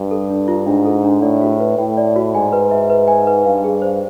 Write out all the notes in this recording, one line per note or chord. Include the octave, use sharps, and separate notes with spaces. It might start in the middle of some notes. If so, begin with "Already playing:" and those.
Already playing: G2
A4
D4
F4
G#2 D4
A4
D4
A2 D5
F#4
B4
A2 G5
D5
F#4
G#2 G#5
B4
E5
B4
G#5
B4
G2 F5
G#4
C5